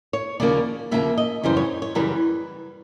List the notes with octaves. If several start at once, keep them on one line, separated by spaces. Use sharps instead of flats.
C#5
D#2 C#3 F3 A#3 D5
D#2 C#3 F3 A#3 E5
D#5
F#2 C#3 E3 G3 C5
C#5
C#5
F#2 C#3 E3 G3 B4